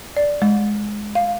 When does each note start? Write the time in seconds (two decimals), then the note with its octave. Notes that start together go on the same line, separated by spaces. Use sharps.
0.17 D5
0.42 G#3
1.15 F5